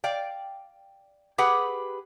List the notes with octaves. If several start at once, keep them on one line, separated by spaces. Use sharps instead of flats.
D5 F5 G5
G4 G#4 B4 F#5